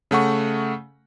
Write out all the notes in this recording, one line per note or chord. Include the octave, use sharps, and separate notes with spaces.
C#3 A3 F#5 C#6